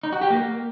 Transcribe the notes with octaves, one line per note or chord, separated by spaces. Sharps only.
D#4
F#4
G4
A#3